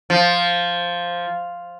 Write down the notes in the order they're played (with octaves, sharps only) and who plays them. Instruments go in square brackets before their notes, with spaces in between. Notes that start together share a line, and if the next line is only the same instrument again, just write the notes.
[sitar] F3